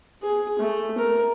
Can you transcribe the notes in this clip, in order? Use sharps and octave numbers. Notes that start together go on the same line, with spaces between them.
G#4
A3
A#4